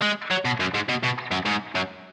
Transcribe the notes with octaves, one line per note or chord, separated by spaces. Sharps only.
G#3
F#3
B2
F#2
G#2
B2
B2
F#2
G#2
F#2